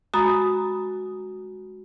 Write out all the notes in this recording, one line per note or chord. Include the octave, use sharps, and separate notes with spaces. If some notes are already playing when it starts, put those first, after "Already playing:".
G#3 F#4 A#5 B5 D#6 A6